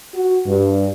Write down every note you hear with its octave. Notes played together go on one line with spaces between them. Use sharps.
F#4
G2